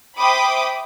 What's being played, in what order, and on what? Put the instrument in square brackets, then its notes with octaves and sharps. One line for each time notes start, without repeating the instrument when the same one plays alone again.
[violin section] C5 E5 G5 B5 D6 D#6